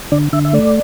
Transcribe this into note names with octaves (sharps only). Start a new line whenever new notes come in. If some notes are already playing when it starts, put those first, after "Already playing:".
D3 D5
D3 E5
E5
A3 D5